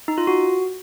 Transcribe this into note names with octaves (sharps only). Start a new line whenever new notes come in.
D#4
F4
F#4